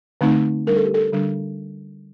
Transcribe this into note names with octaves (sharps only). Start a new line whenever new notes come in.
D3 A3 C4 D#4
G3 D4 A#4
A4
G4
A4
D3 G3 D4